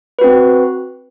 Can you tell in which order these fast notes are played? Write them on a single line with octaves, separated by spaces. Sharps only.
B4 F#4 C4